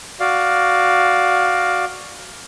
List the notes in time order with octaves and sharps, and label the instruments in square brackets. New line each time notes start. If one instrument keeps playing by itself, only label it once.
[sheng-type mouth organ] F#4 D5 F5